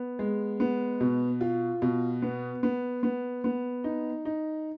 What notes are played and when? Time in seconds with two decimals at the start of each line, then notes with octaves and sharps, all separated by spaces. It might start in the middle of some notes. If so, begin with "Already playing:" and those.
Already playing: B3
0.19 G#3
0.60 B3
1.00 B2
1.41 F4
1.82 B2
2.22 B3
2.63 B3
3.03 B3
3.44 B3
3.84 D#4
4.25 D#4